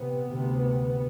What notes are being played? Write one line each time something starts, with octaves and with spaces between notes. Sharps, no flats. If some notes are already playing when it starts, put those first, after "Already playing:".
Already playing: C3 B3
D2 C3